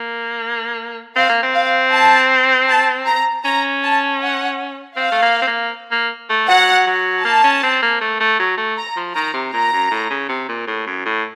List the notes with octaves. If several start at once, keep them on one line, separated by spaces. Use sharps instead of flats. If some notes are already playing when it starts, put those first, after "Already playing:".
Already playing: A#3
C4 F5
A#3
C4
F5
A5
A5
A#5
C#4 A#5
A5
F#5
C4 F5
A3
A#3
C4
A#3
A#3
A3
F#3 F#5
F#3
A#3 A5
C#4
C4
A#3
A3
A3
F#3
A3
A#5
F3
D#3 A#5
C3
A#2 A#5
F#2
A2
C#3
C3
A#2
A2
F#2
A2